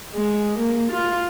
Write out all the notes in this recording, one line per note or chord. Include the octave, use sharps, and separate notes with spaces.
G#3
A#3
F4